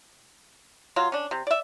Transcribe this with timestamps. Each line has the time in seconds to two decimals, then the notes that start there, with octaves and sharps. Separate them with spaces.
0.96 F#3 F4
1.12 C#4 D4
1.31 C3
1.47 D5 E5